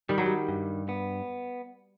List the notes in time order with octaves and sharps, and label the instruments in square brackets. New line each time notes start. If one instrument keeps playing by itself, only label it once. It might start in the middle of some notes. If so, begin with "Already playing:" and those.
[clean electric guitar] D#3 [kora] G3
[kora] F#3
G3
[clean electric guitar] G2
B3